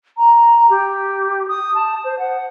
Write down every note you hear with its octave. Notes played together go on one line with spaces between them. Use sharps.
A#5
G4
D#6
A5
C5
F#5